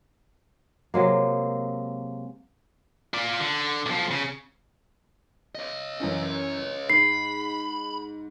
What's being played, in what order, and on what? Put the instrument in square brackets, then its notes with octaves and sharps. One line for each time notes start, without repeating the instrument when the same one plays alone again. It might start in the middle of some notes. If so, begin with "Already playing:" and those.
[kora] C3 F#3 G#3 A#3
[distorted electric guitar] F4 D5
D3
B1 F3
C#3
[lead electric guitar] C#5 D#5
[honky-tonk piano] F#2 E3 C#4
[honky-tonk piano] G#2 [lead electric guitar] B5 [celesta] C7